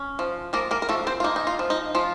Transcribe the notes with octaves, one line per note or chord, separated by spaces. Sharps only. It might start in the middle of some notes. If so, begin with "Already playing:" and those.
Already playing: C#4
F3
F3 A#3 A#4
A#3 A#4
A#4
F3 A3 A4
C4 C5
F4
A#3 D#4
D#4
F4
F3
D#4
F3 F4